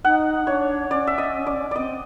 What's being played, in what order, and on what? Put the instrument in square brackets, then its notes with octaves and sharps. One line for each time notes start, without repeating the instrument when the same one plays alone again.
[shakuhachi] D#4 [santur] F#5
[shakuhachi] D4 D#4 [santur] C#5
[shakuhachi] C#4 [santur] D5
[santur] E5
D#5
D5
[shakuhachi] C4 [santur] D5 D#5